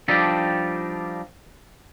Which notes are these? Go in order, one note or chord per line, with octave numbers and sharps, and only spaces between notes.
F3 G3 D4 D#4 G4 A4